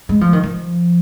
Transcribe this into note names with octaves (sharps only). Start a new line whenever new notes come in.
G#3
F3
D#3
F3